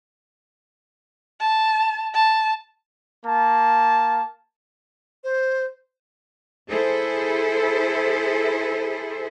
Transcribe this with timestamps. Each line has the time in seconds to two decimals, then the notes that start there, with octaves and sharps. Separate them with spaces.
1.40 A5
2.15 A5
3.25 A#3 A5
5.24 C5
6.70 E4 G#4 A4 C5